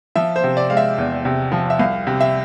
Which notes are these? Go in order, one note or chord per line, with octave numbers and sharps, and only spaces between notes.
F3 E5
C5
C3
D5
G#3 F5
E5
E2
C3
F3
E5
C2 F5
C3
E5